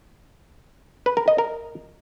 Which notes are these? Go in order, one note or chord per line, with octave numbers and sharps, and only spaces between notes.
B4
A#4
D#5
A#4